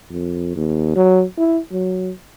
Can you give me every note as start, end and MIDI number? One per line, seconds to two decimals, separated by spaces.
0.11 0.53 41
0.56 0.95 39
0.96 1.23 54
1.38 1.59 64
1.72 2.11 54